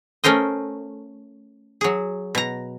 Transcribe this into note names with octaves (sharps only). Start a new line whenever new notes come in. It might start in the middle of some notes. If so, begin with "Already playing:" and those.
A3 C#4 A#4 C5 D#5
F#3 G#4
B2 A#5